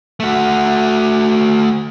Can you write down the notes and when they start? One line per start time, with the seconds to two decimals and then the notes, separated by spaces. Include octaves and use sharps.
0.20 A3 F#4